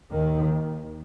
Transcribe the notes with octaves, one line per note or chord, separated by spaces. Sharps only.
D#2 D#3